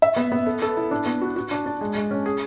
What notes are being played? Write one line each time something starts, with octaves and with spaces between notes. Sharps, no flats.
E5
B3
B3
A4
A4
E4
D4
B3
F#4
F#4
D4
D4
G#3
G#3
C#4
G#4